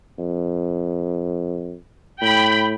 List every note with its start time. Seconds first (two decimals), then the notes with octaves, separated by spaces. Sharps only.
0.19 F2
2.21 A2 G5 B5